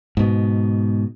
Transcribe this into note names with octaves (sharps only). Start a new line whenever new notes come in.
G#2 B2